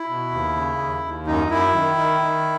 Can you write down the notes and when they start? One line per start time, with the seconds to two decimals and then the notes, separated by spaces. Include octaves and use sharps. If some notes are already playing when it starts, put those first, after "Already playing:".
Already playing: E4
0.09 B2
0.31 D#2
0.56 C#3
0.79 D#2
1.03 D#2
1.27 F#2 D#4
1.50 F#2 E4
1.74 D#3
1.97 D#3
2.21 D#3